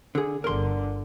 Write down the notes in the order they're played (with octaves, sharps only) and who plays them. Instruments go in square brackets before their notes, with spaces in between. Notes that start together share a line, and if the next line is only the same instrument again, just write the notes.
[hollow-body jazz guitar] D3 G#4
[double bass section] G1 D3 [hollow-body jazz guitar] A#4 C6